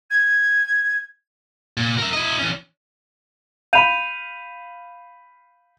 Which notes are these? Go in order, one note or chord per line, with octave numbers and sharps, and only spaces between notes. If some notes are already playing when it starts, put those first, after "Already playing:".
G#6
A#2
A#4 E5
E4 D#5
E3 C#4
F5 B5 G6 D#7 F7